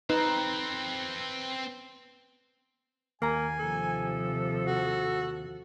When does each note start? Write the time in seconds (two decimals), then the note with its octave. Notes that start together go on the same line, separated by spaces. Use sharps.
0.10 C4 D#4 A4 B4
3.22 D#2 A#3 G#5 A#5
3.60 C3 F3 A4
4.67 F#4